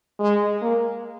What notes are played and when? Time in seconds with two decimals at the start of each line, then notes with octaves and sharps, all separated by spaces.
0.20 G#3
0.62 A#3